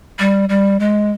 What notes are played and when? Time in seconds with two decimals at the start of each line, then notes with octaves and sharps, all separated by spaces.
0.19 G3
0.49 G3
0.80 G#3